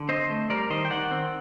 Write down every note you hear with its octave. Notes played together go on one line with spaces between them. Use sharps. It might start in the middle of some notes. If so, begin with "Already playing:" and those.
Already playing: D3
C4 C5 D#5
A3
G3 A#4 D5
D#3 C5 D#5
G5
D#3 D5 F#5
C4